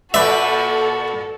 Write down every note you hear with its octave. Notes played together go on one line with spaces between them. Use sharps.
A#2 F#4 A4 B4 D5 E5